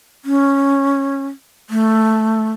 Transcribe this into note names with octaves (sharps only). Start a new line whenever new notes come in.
C#4
A3